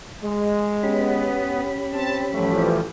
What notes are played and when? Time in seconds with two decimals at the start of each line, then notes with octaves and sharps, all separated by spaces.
0.22 G#3
0.83 B3 C#4 G4 B5
1.93 C4 A5
2.32 A1 E3 F3 G3 A3